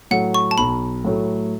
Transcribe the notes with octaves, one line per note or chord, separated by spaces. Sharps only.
A2 F#3 A3 F#5
C#6
A5
B1 B5
A2 F#3 A3